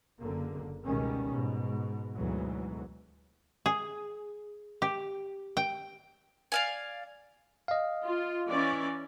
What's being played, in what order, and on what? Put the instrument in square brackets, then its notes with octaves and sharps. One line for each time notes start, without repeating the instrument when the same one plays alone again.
[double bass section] F#1 D3 A#3
C#2 B2 D#3 G3 C#4
G#2 B2
D2 G#2 B2 E3 F#3
[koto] G#4
G4
G5
[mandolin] D5 F5 G#5
[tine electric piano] D#5 F5
[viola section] F4
E3 C#4 D5